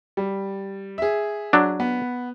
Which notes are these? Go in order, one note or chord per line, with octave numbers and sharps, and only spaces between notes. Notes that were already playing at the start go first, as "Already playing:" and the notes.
G3
G#4 E5
F#3 D4
B3